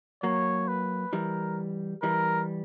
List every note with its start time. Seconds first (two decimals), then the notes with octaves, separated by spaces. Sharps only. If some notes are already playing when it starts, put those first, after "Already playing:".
0.23 F#3 A#3 C#5
0.68 B4
1.13 E3 G3 A#4
2.02 E3 G3 A#4